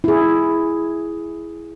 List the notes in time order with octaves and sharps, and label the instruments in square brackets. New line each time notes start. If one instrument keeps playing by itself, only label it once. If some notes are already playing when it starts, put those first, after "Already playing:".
[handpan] E4 G#4